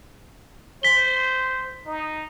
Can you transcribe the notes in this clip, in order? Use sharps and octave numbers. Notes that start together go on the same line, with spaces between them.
C5 B6 G7
D#4